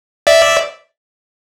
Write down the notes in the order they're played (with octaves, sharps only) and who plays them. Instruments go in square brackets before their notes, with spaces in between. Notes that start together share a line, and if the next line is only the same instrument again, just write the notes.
[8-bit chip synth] D5 E5